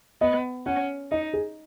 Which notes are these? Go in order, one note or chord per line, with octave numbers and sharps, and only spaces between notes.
B3 D#5
C#4 F#5
D#4 D#5
G#4